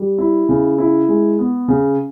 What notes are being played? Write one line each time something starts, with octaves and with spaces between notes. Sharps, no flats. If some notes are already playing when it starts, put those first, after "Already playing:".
Already playing: G3
E4
C#3
E4
G#3
B3
C#3